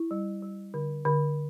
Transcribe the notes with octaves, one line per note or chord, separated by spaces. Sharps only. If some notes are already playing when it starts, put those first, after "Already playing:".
Already playing: E4
G3
G3
D3
D3